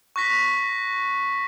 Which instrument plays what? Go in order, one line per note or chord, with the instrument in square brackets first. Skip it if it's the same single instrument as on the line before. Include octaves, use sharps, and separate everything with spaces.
[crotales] C#6 F#6 A#6 B6